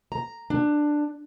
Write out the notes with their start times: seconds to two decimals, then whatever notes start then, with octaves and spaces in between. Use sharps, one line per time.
0.12 A#5
0.50 D4